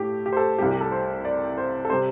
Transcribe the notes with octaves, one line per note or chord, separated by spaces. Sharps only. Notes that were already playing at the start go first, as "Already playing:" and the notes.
Already playing: A2 A3 G4
G4
C5
A4
C2 C3 G3 G4
G4
A4
C5
D5
C5
A4
C3 G3 C5